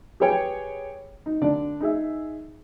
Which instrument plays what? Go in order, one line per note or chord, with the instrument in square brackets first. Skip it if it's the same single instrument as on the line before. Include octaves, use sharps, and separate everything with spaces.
[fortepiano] G4 G#4 B4 C#5 G5 G#5
D#4
D3 D4 D5
D#4 G#4 E5